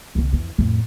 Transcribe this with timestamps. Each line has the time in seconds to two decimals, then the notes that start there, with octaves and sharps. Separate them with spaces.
0.15 C2 D3
0.33 F2 E3
0.58 F2 A2